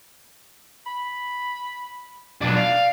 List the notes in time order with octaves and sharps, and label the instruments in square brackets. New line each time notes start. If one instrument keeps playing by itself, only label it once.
[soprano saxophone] B5
[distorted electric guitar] B1 D4
[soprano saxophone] D5 [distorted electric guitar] F5